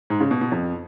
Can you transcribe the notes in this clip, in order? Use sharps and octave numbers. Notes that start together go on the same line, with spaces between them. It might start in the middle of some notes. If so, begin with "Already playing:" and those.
G#2
C#3
B2
B2
F2